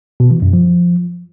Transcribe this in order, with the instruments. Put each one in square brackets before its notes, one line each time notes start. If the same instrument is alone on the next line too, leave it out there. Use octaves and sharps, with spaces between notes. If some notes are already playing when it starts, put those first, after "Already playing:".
[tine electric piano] B2
E3
F#2
F3